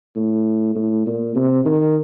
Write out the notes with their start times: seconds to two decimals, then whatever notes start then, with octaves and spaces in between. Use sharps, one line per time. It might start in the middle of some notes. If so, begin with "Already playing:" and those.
0.16 A2
0.75 A2
1.06 A#2
1.35 C3
1.65 D#3